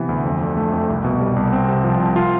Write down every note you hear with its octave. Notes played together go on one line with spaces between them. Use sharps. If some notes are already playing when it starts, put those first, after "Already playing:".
Already playing: C3 E3 B3
D2
F2
D3
A3
F2
C2
B2
G3
C2
C4
C3
F3
C2
F4